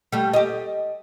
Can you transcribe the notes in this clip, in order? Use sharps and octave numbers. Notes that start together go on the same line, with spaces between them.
G3 A3
G4 D#5